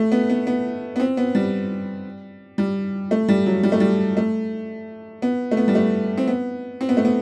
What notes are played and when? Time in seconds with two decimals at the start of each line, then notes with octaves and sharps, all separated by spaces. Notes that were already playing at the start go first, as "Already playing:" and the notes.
Already playing: A3
0.12 B3
0.29 B3
0.47 B3
0.96 B3
1.00 C4
1.17 B3
1.35 G3
2.58 G3
3.11 A3
3.28 G3
3.46 F#3
3.63 G3
3.72 A3
3.80 G3
4.17 A3
5.22 B3
5.51 A3
5.57 B3
5.68 G3
5.75 A3
6.18 C4
6.27 B3
6.81 C4
6.89 B3
6.97 A3
7.05 B3